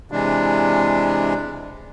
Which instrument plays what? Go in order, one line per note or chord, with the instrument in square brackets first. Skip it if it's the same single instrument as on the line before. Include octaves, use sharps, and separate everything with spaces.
[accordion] C3 E3 G#3 D4